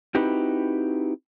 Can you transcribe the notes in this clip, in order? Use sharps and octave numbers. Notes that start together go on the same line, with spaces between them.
C4 D#4 E4 F#4 G4 B4